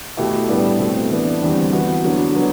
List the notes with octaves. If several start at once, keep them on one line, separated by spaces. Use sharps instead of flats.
B2 A3 E4 G4
A2 G3 B3 D4 G4
B2 A3 C4
E3 B3 D4
E2 D3 G3 C4
E3 B3 F#4
D3 F#3 B3 F#4
D3 F#3 B3